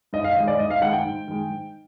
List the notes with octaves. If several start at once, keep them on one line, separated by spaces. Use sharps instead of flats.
G#2 D#5
F5
D#3 G#3 D#5
D5
G#2 D#5
F5
D#3 G#3 F#5
G5
G#2
D#3 G#3
G#2